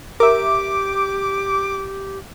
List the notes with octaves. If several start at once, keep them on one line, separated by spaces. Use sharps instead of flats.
G4 A#4 E5 D6